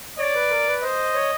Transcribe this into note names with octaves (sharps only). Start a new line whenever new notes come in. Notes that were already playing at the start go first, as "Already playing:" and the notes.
C#5 D5
B4
A#4
B4
C5 D#5
C#5